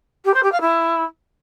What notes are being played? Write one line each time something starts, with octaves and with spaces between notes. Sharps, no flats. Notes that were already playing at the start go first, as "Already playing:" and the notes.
G4
C5
G4
F5
E4